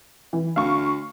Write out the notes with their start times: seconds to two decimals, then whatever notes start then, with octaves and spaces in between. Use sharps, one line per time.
0.33 E3
0.56 D2 F5 C#6